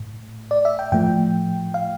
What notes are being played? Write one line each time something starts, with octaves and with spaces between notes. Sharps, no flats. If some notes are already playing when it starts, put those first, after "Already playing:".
Already playing: A2
D5
E5
G5
A2 F3 A3 G5
F5